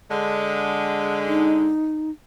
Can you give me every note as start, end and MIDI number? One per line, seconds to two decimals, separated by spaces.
0.11 1.70 50
0.11 1.70 56
1.26 2.10 63